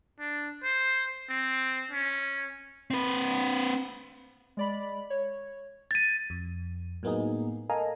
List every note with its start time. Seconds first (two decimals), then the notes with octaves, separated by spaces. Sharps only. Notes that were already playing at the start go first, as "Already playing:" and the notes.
0.19 D4
0.64 C5
1.29 C4
1.91 C#4
2.91 C4 B4
4.57 G#3 D5 B5
5.10 C#5
5.91 G#6 A6 B6 D#7
6.30 F2
7.03 A2 F#3 A#3 B3 D#4 G#4
7.69 A4 A#4 D#5 F5 G#5 A#5